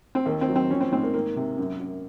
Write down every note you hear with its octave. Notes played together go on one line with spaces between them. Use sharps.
C4
D#2 A#3
C4
F#3
C4
F3 C#4
C4
G#2 C4
A#3
D#3 A#3
C3
F#2
F#2